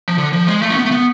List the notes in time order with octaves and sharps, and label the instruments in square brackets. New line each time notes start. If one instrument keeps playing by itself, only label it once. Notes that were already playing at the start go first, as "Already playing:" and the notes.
[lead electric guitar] F3
D3
F3
G#3
A3
C#4
B3
A3
B3